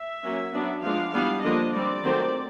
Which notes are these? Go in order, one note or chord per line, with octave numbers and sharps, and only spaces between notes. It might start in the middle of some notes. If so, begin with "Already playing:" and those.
Already playing: E5
F#3 A#3 C#4
F#3 B3 D4
F3 G#3 B3 D4 F5
E3 G3 B3 D4 F5
D3 F3 A#3 D4 D#5
G3 C4 D5
D#3 F#3 A3 C4